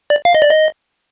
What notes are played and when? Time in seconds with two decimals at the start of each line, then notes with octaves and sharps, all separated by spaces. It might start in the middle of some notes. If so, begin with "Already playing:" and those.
0.10 D5
0.25 F5
0.35 D#5
0.42 D5
0.51 D#5